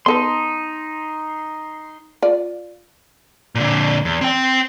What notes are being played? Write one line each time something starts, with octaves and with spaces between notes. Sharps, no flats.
B3 D#4 A4 B4 C6
F4 D5
A#2 D3
E2
C4 G5